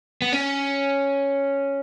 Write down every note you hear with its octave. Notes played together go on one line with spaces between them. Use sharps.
B3
C#4